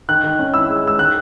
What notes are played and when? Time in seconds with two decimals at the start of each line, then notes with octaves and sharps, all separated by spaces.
0.09 D#3 F#6
0.24 D#3
0.39 C#4
0.54 E4 E6
0.69 G#3
0.84 G#3 E6
0.99 D#3 F#6